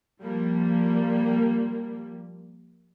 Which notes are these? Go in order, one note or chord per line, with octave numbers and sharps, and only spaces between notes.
F3 G3 A#3